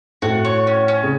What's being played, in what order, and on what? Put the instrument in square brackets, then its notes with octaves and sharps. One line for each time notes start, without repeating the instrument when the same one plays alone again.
[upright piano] A2 [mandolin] F#4
[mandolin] C#5
C#4
C#4
[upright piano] C#3